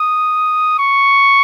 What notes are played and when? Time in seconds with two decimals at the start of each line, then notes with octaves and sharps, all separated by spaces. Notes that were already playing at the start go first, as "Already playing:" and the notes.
Already playing: D#6
0.79 C#6